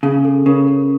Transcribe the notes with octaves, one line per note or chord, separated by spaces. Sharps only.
C#3 G#4
A4
C#3 A#4
A#4